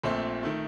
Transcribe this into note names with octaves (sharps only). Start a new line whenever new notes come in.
A#1 A#2 A3 C4
D#3 A3